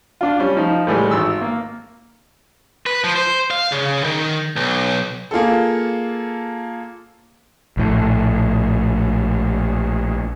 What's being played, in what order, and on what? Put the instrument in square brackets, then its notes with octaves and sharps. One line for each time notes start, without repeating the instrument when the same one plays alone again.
[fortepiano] D4 F4
G3 C#4
F3 D#4
A2 E3 G3 G#3
G#1 E6
A#3
[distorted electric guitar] B4
F3
C5
F5
C#3
D#3
B1
[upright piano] A#3 F4 G#4 A4
[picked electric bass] A#1 A2